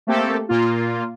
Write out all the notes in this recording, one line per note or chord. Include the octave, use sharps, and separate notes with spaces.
A3 A#3 C4 G4 A4
A#2 A#3 F4